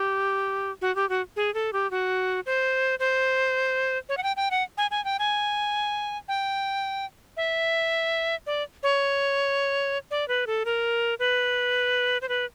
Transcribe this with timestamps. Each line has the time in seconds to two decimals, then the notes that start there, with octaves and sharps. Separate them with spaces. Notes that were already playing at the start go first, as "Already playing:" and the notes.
Already playing: G4
0.81 F#4
0.96 G4
1.09 F#4
1.36 G#4
1.54 A4
1.73 G4
1.91 F#4
2.46 C5
2.99 C5
4.09 C#5
4.17 F#5
4.23 G5
4.36 G5
4.51 F#5
4.78 G#5
4.91 G#5
5.05 G5
5.19 G#5
6.28 G5
7.37 E5
8.47 D5
8.83 C#5
10.11 D5
10.28 B4
10.47 A4
10.65 A#4
11.19 B4
12.22 C5
12.29 B4